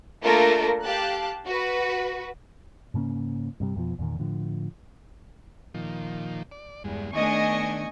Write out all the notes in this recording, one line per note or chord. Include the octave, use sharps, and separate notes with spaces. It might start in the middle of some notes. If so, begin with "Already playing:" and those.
A3 A#3 D4 F4 A4 A#4
G4 F5 A5 F#6
F#4 B4
G#2 C#3 A#3 C#4
G2 C3 G3
F2 B2 F3
E2 A#2 D#3
A2 D3 F3
A#2 D#3 F3
D5
E2 G2 G#3
D#3 A3 B3 D4 D#5 G#5 C#6